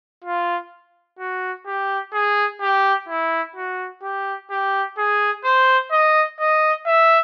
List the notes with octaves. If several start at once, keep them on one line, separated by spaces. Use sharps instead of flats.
F4
F#4
G4
G#4
G4
E4
F#4
G4
G4
G#4
C5
D#5
D#5
E5